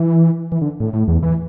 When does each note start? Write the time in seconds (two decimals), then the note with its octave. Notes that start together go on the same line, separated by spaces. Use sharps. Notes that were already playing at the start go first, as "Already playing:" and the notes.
Already playing: E3
0.52 E3
0.62 D3
0.80 A2
0.93 A2
1.08 E2
1.23 E3